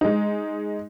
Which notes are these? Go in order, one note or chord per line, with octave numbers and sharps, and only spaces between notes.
G#3 D#4